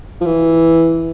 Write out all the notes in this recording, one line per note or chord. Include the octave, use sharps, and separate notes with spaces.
F3
E3